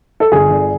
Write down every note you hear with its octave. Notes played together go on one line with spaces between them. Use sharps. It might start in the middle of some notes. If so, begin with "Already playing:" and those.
A4
G1 G#4
D3